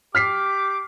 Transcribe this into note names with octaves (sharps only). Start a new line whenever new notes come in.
G4 D6 F6 B6 C7